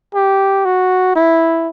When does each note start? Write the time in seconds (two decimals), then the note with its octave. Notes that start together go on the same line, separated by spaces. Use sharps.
0.14 G4
0.65 F#4
1.15 E4